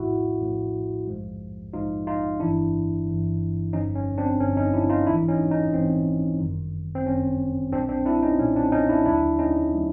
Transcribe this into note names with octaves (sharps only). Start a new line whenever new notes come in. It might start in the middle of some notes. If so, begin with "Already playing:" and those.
Already playing: A#1 A2 F3 A3 E4 F#4
A#1 A2 F3 A3
A#1 G#2 F3 G#3
A#1 G#2 F3 G#3 D#4 F4
D#4 F4
G1 G2 E3 D4 E4
G1 G2 E3
G1 G2 D3 F3 C#4 D#4
C#4
C4 D4
G1 G2 D3 F3 C#4
C#4 D#4
D4 E4
D#4 F4
A#1 G#2 E3 D4 E4
C#4 D#4
C#4 D#4
A#1 G#2 E3 C4
G1 F#2 D#3 G3
C4
G1 F#2 D#3 G3 C#4
B1 A#2 G3 C4 D4
C4 D4
D4 E4
C#4 D#4
B1 A#2 G3 C#4
C4 D4
C#4 D#4
D4 E4
D#2 D3 F#3 A3 D4 E4
C#4 D#4
D3 F#3 A3